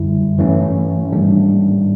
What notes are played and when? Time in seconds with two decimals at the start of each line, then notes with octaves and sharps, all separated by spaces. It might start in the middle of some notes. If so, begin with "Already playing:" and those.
Already playing: F#2 D3 G3 E4
0.38 G2 E3 A3 C#4
1.13 G#2 D#3 G3 A#3 D4